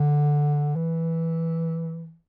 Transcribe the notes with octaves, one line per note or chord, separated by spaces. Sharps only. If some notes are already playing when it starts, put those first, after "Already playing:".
Already playing: D3
E3